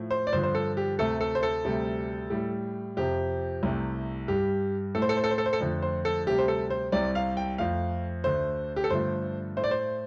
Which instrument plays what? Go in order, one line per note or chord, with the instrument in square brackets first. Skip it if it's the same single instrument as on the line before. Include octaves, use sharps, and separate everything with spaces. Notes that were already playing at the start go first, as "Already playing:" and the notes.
Already playing: [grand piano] A2 F3 A3
C5
D5
G2 D3 F3 C5
C5
A4
G4
D2 C3 A3 A4
A4
C5
A4
D2 C3 G3
A2 G3
F2 C3 F3 G4
C2 C3 A3
G2 G3 G4
A2 A3 A4
C5
A4
C5
A4
C5
A4
C5
A4
F2 D3 F3 A3
C5
A4
D2 C3 G3 G4
C5
A4
C5
C2 C3 G3 D5
F5
G5
F2 F3 A3 F5
D2 D3 A3 C5
G4
A4
G2 D3 F3 A3 C5
A2 A3 C5
D5
C5